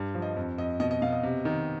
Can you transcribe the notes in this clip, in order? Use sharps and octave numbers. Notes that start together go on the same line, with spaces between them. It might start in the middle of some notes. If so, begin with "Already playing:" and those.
Already playing: G2
F3
D#5
F2
F2 D#5
B2 D#5
D#5
B2 F5
D#5
C3
D#3